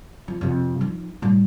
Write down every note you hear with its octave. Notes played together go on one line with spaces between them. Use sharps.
F3
F2 C3
F3 D#4
A2 G3